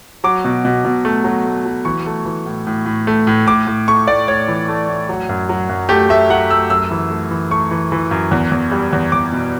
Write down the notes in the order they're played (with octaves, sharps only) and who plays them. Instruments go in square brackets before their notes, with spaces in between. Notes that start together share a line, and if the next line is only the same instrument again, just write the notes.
[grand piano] F#3 D6
B2
B2
B2
A3
F#3
A3
F#3
E3 C#6
A3
E3
A2
A2
A2
A3
A2
A2 D6
A2
A3 C#6
A2 D5
A2 C#5
E3
A3
A2
F#3
F#2
F#3
F#2
A3 G4
A3 E5
F#3 F#5
A3 E6
F#2 E6
E3
A3
E3
A3 C#6
E3
E3
F#2
E2
E2
G3
E2
E2 D6
B2